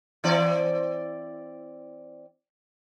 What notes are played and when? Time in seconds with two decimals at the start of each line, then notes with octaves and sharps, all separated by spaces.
0.24 E3 C4 D5